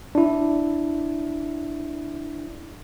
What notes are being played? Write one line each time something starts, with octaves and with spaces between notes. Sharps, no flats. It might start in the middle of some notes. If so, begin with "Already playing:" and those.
D4 E4